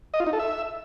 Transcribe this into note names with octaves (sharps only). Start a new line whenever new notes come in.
D#5
F4
D#4
A4
E5